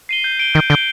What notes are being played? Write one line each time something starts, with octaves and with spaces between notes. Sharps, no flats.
C7 D#7 G7
G6
D7 G7
D#3 G6
D3 D7 G7